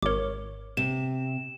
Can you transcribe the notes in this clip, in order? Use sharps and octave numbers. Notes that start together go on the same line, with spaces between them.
G#1 A#4 C#5 D6
C3 E7